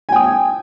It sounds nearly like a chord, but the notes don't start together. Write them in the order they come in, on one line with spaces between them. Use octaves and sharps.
G#5 G5 D#6